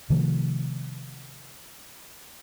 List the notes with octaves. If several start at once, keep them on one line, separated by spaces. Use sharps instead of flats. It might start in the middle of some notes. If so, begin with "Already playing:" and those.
C3 D#3 F3 A3